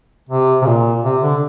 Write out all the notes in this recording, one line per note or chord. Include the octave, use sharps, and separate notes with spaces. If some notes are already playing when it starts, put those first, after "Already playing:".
C3
C3
A#2
C3
D3